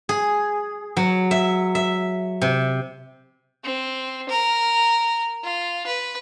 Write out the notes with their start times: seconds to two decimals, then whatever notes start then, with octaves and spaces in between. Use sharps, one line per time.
0.09 G#4
0.97 F#3
1.31 E5
1.75 E5
2.42 C3
3.64 C4
4.29 A#4
5.44 F4
5.87 B4